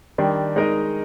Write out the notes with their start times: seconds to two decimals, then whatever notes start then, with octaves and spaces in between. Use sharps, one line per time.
0.18 D#3 G3 D4
0.56 G#3 D#4 A#4 D#5